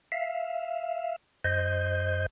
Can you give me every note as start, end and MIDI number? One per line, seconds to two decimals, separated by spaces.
0.12 1.16 76
0.12 1.16 77
1.44 2.26 42
1.44 2.26 72
1.44 2.26 75
1.44 2.26 91